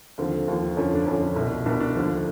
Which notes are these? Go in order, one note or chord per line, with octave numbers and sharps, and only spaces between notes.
D#2 D3 F3 C4
D#2 D3 F3
F2 D3 F3 C#4
D4
F2 D3 F3 C#4
C2 B2
C2 B2 D4
D4
D#2 D3 F3